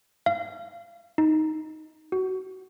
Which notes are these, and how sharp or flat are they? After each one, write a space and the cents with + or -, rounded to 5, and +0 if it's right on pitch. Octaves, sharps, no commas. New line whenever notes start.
F5 -30
D#4 +5
F#4 +20